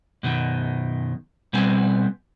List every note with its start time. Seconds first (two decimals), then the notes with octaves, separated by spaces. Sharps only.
0.23 F#2 B2 D#3
1.53 B2 G3 B3 C4 G#5